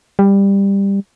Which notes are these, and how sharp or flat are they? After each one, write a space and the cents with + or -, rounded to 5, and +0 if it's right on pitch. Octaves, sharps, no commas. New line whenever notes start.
G3 +15